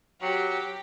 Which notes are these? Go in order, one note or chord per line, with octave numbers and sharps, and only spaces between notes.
F#3 G4